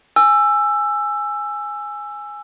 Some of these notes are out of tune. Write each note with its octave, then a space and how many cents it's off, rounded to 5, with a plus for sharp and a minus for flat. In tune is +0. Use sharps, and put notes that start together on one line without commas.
G#5 +0 E6 +15